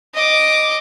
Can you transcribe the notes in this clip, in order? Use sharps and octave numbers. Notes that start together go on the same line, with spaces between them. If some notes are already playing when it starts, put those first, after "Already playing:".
D#5 D6